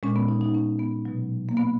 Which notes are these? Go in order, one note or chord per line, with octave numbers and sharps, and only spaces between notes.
A#2 G#3 C#4
B3
D#4
D#4
C#4
B3
B2 F#3
A#3
B3